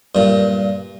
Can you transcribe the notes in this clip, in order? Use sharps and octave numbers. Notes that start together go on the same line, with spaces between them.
G2 A#2